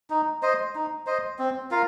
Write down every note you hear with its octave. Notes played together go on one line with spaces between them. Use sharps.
D#4
C5 D#5
D#4
C5 D#5
C4
F4 A#4 F5